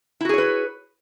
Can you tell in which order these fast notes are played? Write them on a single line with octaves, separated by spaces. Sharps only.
E4 F#4 G#4 C#5 B4